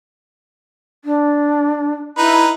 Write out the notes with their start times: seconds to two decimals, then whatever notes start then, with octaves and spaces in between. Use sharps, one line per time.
1.05 D4
2.18 D#4 E4 B4